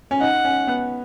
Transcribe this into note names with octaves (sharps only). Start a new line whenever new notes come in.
C#4
D#4 F#5
C#4
B3